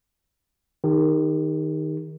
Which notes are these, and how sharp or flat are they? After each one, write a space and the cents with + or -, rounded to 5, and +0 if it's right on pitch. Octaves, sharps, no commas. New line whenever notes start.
D#3 +0 G4 +40